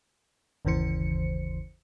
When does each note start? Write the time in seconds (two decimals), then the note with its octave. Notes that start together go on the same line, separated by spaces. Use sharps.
0.65 G1 D#2 C#3 E3 C5 C#7